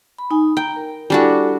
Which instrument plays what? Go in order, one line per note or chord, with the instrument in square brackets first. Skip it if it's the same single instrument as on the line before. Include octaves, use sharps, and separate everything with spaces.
[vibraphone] B5
D#4 G#5
[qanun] G5 [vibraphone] A#5
[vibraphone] A#4
[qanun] G3 D4 F#4 [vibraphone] E4 A4 G#5